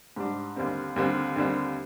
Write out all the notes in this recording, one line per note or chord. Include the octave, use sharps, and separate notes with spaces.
G#2 G3 D4
D#2 D3 G3 C4
D#2 D3 G3 C4
D#2 D3 G3 C4